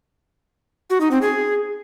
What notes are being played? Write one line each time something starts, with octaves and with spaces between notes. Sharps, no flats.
F#4
D#4
C4
G#4